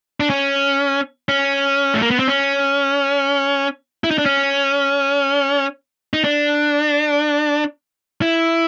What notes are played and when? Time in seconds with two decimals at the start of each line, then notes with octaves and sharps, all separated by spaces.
0.20 D4
0.30 C#4
1.29 C#4
1.94 A3
2.02 A#3
2.10 B3
2.19 C4
2.28 C#4
4.04 E4
4.11 D#4
4.18 D4
4.26 C#4
6.13 D#4
6.24 D4
8.22 E4